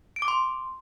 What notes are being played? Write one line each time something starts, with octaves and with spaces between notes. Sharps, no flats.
D7
D6
C6